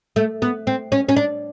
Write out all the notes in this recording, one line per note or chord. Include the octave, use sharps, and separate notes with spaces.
A3
B3
C4
C#4
C#4
D4